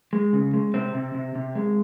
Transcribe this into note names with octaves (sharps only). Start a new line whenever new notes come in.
G#3
C#3
G#3
C3 C4
C3
C3
C3
G#3